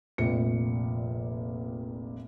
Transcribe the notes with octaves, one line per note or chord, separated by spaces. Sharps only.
F1 A#1 A#2 C#7